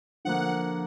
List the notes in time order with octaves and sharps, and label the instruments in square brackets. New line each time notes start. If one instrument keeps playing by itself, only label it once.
[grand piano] D3 F3 A#3 [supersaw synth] F#5